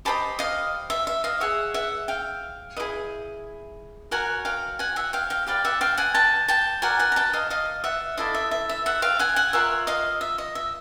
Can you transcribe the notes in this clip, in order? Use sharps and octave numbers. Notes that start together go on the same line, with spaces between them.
G4 C5 D#5 A5 B5
D#5 F5
E5
E5
D#5 F5
G#4 C#5 E5 F#5
E5 F#5
F5 G5
E4 G#4 B4 D#5
F#4 A#4 C#5 F#5 G#5
F5 G5
F#5 G#5
E5 F#5
F5 G5
F5 G5
G4 B4 D5 F5 G5
E5 F#5
F5 G5
F#5 G#5
G5 A5
G5 A5
F#4 A#4 D5 F#5 G#5
F#5 G#5
A#5
G5 A5
D#5 F5
D#5 F5
E5 F#5
E4 A4 D5 D#5 F5
E5
E5
E5
E5 F#5
F5 G5
F#5 G#5
F#5 G#5
F4 A#4 C#5 E5 F#5
D#5 F5
E5
D#5
E5